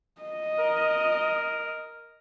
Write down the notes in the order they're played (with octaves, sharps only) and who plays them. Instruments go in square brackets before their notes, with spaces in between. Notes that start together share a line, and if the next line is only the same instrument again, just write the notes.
[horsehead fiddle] D#5
[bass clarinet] A#4